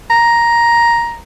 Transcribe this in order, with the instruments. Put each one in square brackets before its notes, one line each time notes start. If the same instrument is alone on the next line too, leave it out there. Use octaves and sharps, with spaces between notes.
[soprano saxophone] A#5